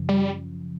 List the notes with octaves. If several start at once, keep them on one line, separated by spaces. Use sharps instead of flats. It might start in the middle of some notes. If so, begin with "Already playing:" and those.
Already playing: F#2 C#3 F3
G3